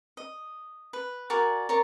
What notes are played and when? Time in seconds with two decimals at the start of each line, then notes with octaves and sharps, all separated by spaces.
0.17 D#5
0.93 B4
1.30 F#4 A#4 D5 G#5
1.69 A#4 C#5 D5 C#6